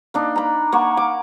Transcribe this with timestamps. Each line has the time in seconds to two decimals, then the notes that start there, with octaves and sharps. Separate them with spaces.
0.14 A#3 D4 D#4
0.36 A#5 B5
0.72 A#3 F#5 C#6
0.97 D6